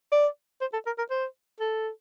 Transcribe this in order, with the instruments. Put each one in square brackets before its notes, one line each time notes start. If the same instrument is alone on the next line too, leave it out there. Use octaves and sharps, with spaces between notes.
[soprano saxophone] D5
C5
A4
A#4
A#4
C5
A4